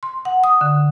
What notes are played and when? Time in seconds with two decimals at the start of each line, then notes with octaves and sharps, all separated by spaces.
0.03 C6
0.25 F#5
0.44 D#6
0.61 D3